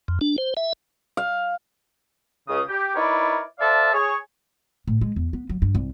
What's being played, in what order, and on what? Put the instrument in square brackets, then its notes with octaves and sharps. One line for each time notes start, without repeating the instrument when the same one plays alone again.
[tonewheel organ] F2
D4
C5
E5
[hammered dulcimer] F5
[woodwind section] C#2 C#3 D#6
G4
D#4 E4 A#4 B4 C#5 D5
A4 C5 D5 E5 F5 A5
G#4 C#5
[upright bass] A2
G#3
E2
B3
F#3
G2
C2